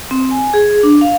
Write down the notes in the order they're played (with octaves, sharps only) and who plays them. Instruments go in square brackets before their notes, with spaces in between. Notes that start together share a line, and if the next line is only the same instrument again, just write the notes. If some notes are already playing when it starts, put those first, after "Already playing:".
[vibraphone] C4
G#5
G#4
D4
F5